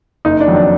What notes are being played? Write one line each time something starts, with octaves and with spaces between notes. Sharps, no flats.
F#1 D#4
D4
F2 D#3 F#3
D4